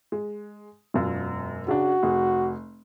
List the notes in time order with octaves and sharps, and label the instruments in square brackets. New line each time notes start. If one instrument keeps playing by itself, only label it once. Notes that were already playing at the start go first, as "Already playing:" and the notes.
[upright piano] G#3
E1 F#2 F4
[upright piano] C#3 D4 [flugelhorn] F#4
[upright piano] F1 G#4